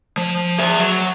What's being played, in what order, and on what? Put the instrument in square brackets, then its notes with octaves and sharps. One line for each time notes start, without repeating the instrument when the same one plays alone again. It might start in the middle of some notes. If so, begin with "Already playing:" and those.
[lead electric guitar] F3
G#4 E5
F#3